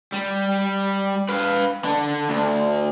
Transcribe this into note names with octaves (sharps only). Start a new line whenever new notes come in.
G3
B4 F5
D3 D4
D2